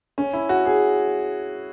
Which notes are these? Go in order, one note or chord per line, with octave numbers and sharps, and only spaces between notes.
C#4
E4
F#4
G#4